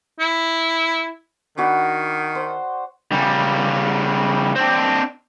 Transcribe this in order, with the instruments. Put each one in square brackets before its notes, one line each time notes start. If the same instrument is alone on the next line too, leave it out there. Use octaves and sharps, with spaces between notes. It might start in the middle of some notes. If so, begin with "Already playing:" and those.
[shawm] E4
[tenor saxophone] D#3 [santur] D4 F#4 B5
[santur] C5
[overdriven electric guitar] C#3 G3
C4 D4